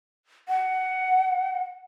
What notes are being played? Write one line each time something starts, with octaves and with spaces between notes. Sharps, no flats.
F#5